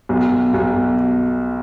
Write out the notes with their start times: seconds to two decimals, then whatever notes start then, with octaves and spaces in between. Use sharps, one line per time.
0.09 B1
0.54 B1